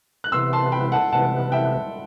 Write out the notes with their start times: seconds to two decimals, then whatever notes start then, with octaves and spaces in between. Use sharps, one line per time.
0.24 F#6
0.32 C3 E3 B3 C6 E6
0.53 A5 C6
0.72 G5 B5
0.92 F#5 A5
1.12 C3 E3 B3 F#5 A5
1.52 E5 G5